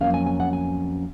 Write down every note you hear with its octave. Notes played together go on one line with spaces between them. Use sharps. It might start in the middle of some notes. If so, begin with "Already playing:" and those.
F2 C#3 F#3 A#3 C#4 F5
G#5
G#5
F#5
G#5